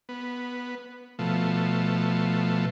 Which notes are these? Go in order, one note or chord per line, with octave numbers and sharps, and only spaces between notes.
B3
B2 F3 A3